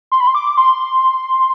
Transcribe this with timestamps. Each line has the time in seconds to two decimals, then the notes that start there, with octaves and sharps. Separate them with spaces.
0.12 C6
0.20 B5
0.27 C6
0.35 D6
0.57 C6